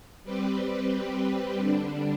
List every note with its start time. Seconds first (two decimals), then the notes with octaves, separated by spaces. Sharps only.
0.23 G3 C4 G4 B4
1.58 D3 G3 D4